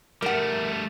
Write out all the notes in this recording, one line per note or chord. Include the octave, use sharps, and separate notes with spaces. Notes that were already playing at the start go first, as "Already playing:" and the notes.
G3 A3 A#4 F#5